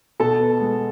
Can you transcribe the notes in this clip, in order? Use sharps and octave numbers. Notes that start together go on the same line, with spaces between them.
B2 A4 A5
B3
G#3